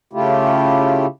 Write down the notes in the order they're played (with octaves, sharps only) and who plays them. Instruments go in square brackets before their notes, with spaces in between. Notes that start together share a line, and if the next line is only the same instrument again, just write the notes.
[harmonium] C#3 A3 E4 F4 G4